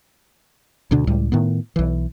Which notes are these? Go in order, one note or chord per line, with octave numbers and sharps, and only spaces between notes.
D2 B2 D3 D4
C#2 A2 G3
A2 D#3 B3
B1 E3